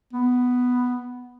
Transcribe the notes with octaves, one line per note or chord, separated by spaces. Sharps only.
B3